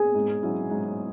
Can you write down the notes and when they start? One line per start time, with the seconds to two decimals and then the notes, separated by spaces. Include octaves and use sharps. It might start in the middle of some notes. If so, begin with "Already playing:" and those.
Already playing: G#4 G#5
0.15 G#2
0.43 F#3 C#4 E4
0.70 G#2